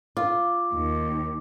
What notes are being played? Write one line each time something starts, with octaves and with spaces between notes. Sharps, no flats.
F4 D6
D#2